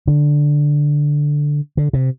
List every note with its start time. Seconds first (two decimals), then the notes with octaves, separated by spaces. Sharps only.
0.07 D3
1.77 D3
1.93 C3